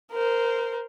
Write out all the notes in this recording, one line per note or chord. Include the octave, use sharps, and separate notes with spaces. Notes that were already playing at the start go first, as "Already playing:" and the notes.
A#4 C5